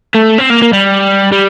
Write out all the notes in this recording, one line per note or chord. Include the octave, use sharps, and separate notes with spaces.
A3
C4
A#3
A#3
G3
G3